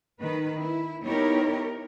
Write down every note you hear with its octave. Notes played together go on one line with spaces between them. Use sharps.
D#3 B4
E4
B3 D#4 E4 G4 A#4 C#5